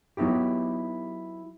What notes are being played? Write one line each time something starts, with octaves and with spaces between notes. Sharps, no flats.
F#3 B3 D#4 E4 G4